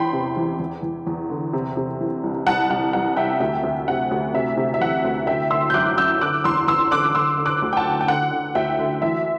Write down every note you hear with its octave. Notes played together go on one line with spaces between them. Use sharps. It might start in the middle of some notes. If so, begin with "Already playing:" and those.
Already playing: E2 E3 G5 B5 C6
C3
E3
E2
E2
E2
D3
C3
C3
E3
C2
C2 F#5 A5
C2 F#5
C2 F#5
C3 E5 G5
D2 E5 G5
D2
C3 F#5
D2
C3 E5
C3
E5
E3 F#5
D2
D3 E5 G5
D3 C6 E6
G6
F#2 D6 F#6
F#2 E6 G6
D3 D6 F#6
E2 C6 E6
E2 C6 E6
D3 D6 F#6
D3 C6 E6
D3
D6 F#6
D2
G5
F#5 A5
D3
G5
D3 F#5
D3
D2 E5 G5
D3
E3 E5